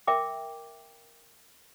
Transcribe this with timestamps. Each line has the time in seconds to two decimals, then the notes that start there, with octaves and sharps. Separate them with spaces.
0.07 A#4 E5 G5 D6